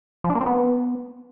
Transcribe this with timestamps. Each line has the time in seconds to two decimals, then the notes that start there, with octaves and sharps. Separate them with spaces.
0.24 F3
0.30 D4
0.35 A#3
0.41 C4
0.46 B3